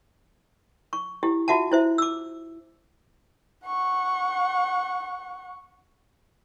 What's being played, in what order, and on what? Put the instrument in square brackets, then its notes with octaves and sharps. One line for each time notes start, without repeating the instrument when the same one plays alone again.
[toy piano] C#6
E4 G4
F4 F#4 E5 F#5 A5
E4 C5 E5
D6 E6
[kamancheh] F#5 C#6